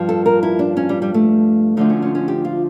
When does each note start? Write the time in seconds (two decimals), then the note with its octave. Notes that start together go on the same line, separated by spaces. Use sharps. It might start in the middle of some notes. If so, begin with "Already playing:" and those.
Already playing: G2 F3
0.09 A4
0.26 A#4
0.43 E4
0.59 D4
0.77 C#4
0.89 G3
1.02 G3
1.14 A3
1.77 D2 D3 F3 A3
1.90 C#4
2.02 C#4
2.15 C#4
2.28 G4
2.45 F4